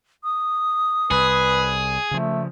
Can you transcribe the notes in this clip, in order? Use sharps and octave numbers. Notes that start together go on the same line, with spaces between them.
D#6
C2 G#4 B4
C#3 F3 A3